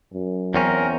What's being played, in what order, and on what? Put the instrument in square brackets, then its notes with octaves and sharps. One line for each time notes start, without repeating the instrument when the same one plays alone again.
[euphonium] F#2
[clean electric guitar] E2 C4 C#4 [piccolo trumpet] A#4